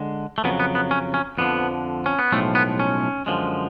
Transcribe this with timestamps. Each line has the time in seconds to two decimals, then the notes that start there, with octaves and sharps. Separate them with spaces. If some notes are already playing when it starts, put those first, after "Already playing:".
Already playing: D3 G#3
0.38 A3
0.44 F2 C#3 F#3 B3
0.60 B3
0.75 B3
0.91 C#4
1.14 C#4
1.38 F2 D3 F3 B3
2.06 C#4
2.19 B3
2.32 B1 A2 F3 G#3 A3
2.55 B3
2.80 C#4
3.26 F#2 D3 F3 G#3